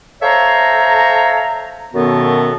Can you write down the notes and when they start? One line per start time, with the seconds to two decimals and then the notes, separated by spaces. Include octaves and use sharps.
0.22 A4 C5 C#5 E5 F5 A#5
1.93 F#2 B2 D#3 B3 F#4 A4